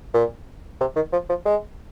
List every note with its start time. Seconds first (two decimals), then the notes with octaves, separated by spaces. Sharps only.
0.14 A#2
0.81 C3
0.96 D#3
1.13 F3
1.29 F3
1.46 G#3